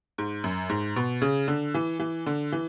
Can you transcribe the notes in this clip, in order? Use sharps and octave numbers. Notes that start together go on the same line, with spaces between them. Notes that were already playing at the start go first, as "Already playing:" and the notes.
G#2
F#2
G#2
B2
C#3
D3
E3
E3
D3
E3